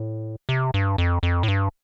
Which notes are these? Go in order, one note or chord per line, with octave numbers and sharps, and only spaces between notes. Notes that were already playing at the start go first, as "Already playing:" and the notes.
Already playing: A2
C3
G2
F2
F2
A2
G2